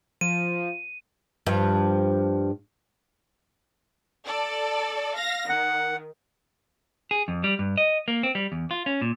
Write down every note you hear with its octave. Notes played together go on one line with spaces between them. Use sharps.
F3 D#7
G2 F3
A4 D5
F5 A#6
D#3 F#5
G#4
F2
G3
G2
D#5
A#3
C4
G3
E2
F4
C#4
A#2